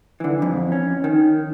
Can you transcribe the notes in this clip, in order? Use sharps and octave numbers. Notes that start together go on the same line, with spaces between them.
D3 E3
F2
C#4
D#3